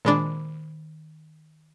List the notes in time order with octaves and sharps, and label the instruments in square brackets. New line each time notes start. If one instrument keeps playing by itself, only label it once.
[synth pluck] A#2 G#3 D4 [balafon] D#3 B5 D6